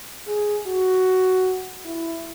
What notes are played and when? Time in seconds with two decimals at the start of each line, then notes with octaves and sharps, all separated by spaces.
0.27 G#4
0.66 F#4
1.85 E4